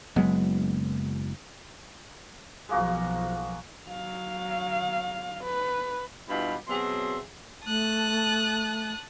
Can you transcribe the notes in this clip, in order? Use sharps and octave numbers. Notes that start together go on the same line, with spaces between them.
F#1 F#3 G#3 B3
B1 F3 G#3 A#3 F#4
F#3 F5
B4
G2 B2 E4 F4 G4 B5
B2 F#3 C4 G#4 E5 C6
A3 A5 D#6 F#6